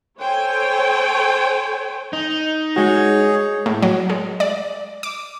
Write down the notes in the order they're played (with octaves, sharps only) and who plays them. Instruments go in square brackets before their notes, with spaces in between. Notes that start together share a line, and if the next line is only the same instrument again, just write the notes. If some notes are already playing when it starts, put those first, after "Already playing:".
[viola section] A4 C5 C#5 G5 G#5
[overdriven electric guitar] D#4
[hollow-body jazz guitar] G#3 F#4 [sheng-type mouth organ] G#4 C#5
[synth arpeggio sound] A2
F#3
G#3
D5
D6